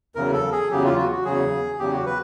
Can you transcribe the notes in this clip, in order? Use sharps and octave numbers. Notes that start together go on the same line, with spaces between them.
E2 C#3 F#3 A#4
A4
G#4
E2 C#3 F#3 G4
F4
F#4
F#4
E2 C#3 F#3 G#4
E2 C#3 F#3 G4
F#4
B4